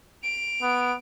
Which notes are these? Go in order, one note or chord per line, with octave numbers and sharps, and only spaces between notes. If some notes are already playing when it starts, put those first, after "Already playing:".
D7 F7
B3